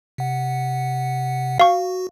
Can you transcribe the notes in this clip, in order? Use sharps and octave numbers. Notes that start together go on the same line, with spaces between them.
C3 F#5
F#4 F5 C#6